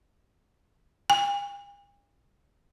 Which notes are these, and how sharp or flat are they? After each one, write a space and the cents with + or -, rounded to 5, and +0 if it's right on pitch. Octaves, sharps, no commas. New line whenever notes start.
G#5 -45